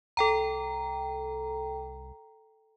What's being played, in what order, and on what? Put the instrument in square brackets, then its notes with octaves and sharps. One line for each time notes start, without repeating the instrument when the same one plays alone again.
[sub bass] C2 [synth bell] A4 G5 A#5